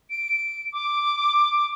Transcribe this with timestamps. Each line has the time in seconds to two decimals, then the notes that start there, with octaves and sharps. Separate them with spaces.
0.10 D7
0.73 D6